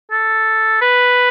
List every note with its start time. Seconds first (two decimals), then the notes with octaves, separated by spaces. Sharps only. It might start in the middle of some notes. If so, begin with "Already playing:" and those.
0.11 A4
0.81 B4